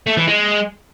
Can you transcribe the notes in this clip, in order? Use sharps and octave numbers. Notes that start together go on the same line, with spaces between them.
A3
E3
G#3